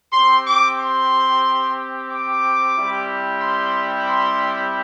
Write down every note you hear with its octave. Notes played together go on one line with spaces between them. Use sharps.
C4 G4 C6
D6
C6
D6
G3 C4 E4 G4
C6
C6